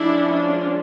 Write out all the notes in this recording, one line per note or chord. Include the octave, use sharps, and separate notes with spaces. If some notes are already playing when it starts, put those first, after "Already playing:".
Already playing: F3 G#3 C#4 D4 E4
D4